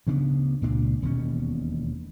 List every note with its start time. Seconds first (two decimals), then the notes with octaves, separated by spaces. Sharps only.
0.07 D2 C#3 B3 D4
0.62 C#2 A#2 D4
1.02 E1 D#2 B2 C#4